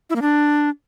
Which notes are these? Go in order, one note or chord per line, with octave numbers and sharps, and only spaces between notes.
E4
A#3
D4